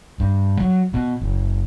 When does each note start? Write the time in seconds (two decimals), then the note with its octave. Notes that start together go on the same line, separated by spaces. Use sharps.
0.20 G2
0.60 F#3
0.94 B2
1.21 F#1